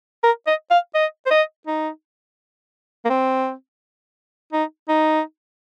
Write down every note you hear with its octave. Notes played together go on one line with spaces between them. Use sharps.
A#4
D#5
F5
D#5
C5
D#5
D#4
A#3
C4
D#4
D#4